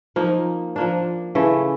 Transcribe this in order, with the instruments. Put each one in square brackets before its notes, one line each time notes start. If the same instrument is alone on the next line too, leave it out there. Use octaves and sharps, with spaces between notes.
[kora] F3 A#3 D#4
F3 A#3 D4
C#3 E3 A3